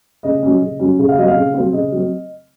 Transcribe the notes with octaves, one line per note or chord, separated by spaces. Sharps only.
C#3 D#5
F#3 C#4
C#3
F#3 C#4
C#3
F5
F#3 C4 D#5
F5
C#3
F#3 C4
C#3 D#5
F#3 C4